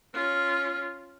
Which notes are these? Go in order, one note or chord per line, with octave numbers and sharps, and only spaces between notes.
C#4 F4